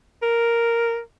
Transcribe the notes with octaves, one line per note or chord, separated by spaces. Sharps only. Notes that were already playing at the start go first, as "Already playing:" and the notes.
A#4